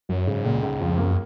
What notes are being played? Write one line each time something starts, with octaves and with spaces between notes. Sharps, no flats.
F#2 F#3
G#2 C#3
C#2 A#2
C#2 G#2
F2 F3
F#2 A#3